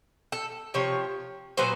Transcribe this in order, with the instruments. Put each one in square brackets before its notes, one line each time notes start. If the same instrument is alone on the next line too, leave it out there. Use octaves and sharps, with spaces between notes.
[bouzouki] A4
C3 F3 C#5
A#2 F#3 B3 C5